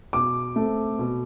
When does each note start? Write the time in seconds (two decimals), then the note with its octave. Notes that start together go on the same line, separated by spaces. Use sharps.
0.13 B2 D6
0.56 A3 C4
0.99 B2